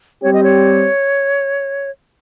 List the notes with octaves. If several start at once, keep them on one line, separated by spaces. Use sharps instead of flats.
G3 C4 G4 C#5
D#5
C#5